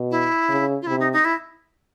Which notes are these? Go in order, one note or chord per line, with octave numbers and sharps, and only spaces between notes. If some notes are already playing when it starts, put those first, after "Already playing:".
Already playing: B2
E4
C#3
F4
C3 E4
D#4
D#4
E4